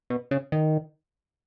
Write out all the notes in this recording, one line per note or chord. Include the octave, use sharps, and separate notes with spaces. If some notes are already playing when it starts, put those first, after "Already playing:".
B2
C#3
D#3